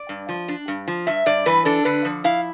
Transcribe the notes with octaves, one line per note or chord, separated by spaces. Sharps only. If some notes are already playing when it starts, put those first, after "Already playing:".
Already playing: D5
G2
F3
D4
G2
F3
G2 E5
G2 D5
E3 B4
D4 A4
D3 B4
F3
E4 F5